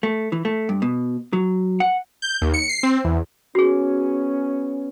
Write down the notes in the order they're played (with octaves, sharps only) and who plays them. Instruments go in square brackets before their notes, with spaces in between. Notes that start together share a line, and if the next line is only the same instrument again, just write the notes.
[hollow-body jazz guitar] A3
E3
A3
G2
B2
F#3
F#5
[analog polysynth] G6
D#2
C#7
C7
C4
E2
[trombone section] B3 C#4 [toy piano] F#4 G#4